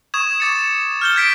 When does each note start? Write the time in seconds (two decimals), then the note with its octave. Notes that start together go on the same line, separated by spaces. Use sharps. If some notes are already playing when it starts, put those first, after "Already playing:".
0.14 C#6 D#6 G#6 E7
0.40 D6 A6 C#7
1.01 F6 G6 G7
1.16 G#6 B6 D7